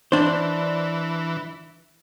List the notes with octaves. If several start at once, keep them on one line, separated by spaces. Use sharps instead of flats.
E3 D4 C5